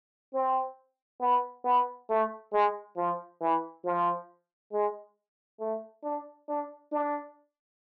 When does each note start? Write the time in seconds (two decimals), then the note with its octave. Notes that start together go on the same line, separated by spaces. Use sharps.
0.33 C4
1.21 B3
1.64 B3
2.10 A3
2.53 G#3
2.97 F3
3.41 E3
3.84 F3
4.73 G#3
5.60 A3
6.04 D4
6.49 D4
6.92 D4